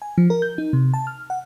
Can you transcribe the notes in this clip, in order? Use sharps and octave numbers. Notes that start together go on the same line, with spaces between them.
G#5
F3
A#4
G6
D#4
C3
A5
F6
F#5